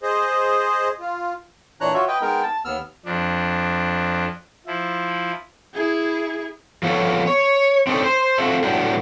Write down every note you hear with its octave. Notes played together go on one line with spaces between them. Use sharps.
G#4 C5 D#5
F4
A#2 E3 D4 C#5 A#5 F#6
F4 F#4 C#5 E5
B4 D#5 G5
G#3 B3 D#4 A#4 G5
A5
D#2 B3 E6 F6
F2 D4
F3 E4
E4 G#4
F3 A3 B3 F4 A4 C#5
C#5
C4 D4 D#4 F#4 A4 C#5
C5
A3 C4 F4 F#4 A4 E5
A2 F#3 G3 B3 D4